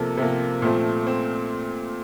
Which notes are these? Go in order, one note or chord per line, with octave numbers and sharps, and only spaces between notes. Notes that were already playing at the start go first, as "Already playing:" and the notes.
Already playing: C3 F3 A#3 A4
C3 F3 A#3
A#2 F3 A3 C4
C4